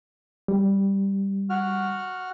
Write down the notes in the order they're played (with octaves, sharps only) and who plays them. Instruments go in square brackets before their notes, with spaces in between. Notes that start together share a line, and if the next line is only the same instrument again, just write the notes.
[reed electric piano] G3
[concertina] F#4 F6